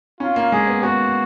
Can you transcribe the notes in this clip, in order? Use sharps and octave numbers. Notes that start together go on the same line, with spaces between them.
C#4 F4
A#3
G#3 G#4
B3
B3 F#4